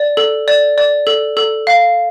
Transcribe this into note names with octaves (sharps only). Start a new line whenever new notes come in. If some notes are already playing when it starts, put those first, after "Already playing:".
Already playing: D5
A4
D5
D5
A4
A4
F5